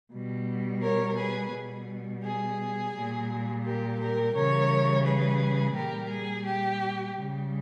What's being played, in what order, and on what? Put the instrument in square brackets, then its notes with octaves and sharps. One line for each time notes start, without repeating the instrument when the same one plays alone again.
[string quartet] B2 G3
A#4 C#5
G#4 B4
B2 G3
G#4
A#2 G3
G4 A#4
G4 A#4
C#3 E3 G3 A#4 C#5
G#4 B4
A#2 G3 G4 A#4
G#4
G4
C#3 G3